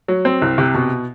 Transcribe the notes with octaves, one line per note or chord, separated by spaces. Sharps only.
F#3
C4
C2
C3
B2